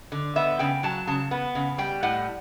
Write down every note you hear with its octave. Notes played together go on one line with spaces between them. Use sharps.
D3
B3 E5
C#3 G5
F#3 A5
C#3 A5
B3
C#3
G3 G5
A2 F#5